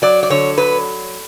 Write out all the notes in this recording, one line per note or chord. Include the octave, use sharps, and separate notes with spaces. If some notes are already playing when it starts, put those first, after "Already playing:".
F#3 D5
D5
D3 C#5
F#3 B4